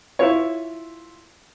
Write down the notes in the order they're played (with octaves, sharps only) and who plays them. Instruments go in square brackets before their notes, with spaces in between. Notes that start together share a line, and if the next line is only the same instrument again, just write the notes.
[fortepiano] E4 F4 C#5